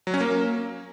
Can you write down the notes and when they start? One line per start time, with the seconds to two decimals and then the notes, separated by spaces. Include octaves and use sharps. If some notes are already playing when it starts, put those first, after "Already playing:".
0.07 F#3
0.14 C#4
0.21 A#3